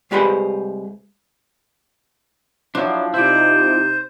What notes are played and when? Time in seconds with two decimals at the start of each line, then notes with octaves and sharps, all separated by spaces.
0.11 C2 G#3 G4 B4 C5 B5
2.75 F3 F#3 D4 E4
3.14 C3 D#4 E4 C5 D5